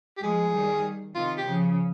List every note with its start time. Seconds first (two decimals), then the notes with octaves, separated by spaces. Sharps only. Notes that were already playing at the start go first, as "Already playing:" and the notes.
0.17 G4
0.22 F3 G#3 G#4
0.53 D#3 G3
1.15 C3 D#3 F4
1.38 G4
1.45 C#3 F3